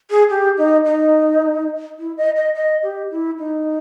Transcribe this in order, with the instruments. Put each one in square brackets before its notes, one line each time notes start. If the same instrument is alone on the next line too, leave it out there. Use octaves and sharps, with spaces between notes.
[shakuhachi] G#4
G4
D#4
D#4
E4
D#5
D#5
D#5
G4
E4
D#4